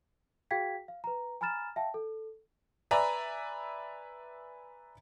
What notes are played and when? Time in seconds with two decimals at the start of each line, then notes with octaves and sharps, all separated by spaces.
0.51 F#4 G#4 F5 G5 G#6 B6
0.88 F5
1.04 B4 A#5
1.41 G#5 A#5 B5 F6 A6 E7
1.76 E5 F5 G5 A5
1.94 A4
2.91 B4 D5 E5 G#5 A#5